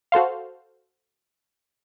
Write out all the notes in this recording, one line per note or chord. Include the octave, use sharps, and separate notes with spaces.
F#4 A4 C5 F5